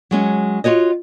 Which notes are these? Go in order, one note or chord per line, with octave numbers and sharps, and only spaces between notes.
F#3 G#3 C#4
F4 F#4 C#5 D#5